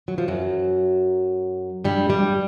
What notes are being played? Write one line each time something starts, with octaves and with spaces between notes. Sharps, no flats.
F#3
F3
F#2 F#3
G2 G3
G2 G3